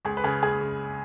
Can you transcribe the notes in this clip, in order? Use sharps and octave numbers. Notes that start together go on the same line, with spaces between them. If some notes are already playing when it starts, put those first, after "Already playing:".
C#2 G#4
B4
C#3 G#4
C#2 G#4
C#3